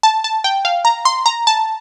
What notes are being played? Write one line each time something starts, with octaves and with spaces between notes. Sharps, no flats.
A5
A5
G5
F5
A#5
C6
A#5
A5